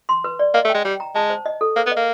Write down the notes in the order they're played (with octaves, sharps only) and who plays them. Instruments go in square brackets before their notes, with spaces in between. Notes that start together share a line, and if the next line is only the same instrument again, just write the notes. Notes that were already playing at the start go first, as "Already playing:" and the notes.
[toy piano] C6
B4
D5
[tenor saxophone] A#3 [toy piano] D#5
[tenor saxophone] A3
[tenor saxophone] G#3 [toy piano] G5
[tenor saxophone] G3 [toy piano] G5
[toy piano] A#5
[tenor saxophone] G#3 [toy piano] A5
[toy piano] C5
D#5
A4
[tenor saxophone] A#3 [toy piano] C5
[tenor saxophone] B3
[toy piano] D#5
[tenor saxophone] A#3